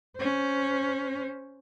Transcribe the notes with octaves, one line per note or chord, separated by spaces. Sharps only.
C#4 C5